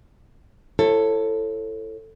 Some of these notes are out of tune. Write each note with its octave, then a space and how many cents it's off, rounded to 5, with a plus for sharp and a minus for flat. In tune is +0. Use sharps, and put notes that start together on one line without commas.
E4 +25 A4 +10 C#5 -30